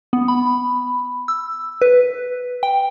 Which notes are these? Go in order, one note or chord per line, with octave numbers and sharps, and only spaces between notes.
B3
B5
E6
B4
G5